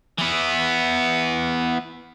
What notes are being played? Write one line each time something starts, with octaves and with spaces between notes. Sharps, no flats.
E3 B3